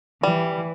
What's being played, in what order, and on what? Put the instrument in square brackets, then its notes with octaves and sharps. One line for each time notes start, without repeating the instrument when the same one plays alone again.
[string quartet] E3 [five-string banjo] G3